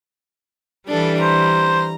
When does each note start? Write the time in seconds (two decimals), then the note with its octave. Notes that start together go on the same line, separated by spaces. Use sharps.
0.88 E3 G3 D4 A4
1.21 C5 A#5